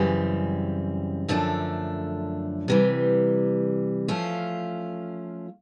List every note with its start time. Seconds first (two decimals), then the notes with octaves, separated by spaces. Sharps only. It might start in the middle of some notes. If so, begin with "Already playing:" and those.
Already playing: F#2 C#3 E3 G3 C4
1.28 F#2 D3 F3 A3 D4
2.68 C3 E3 G3
4.08 F3 A3 C#4 F4